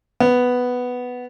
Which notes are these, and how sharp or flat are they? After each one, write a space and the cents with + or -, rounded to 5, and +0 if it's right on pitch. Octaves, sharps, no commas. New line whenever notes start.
B3 +5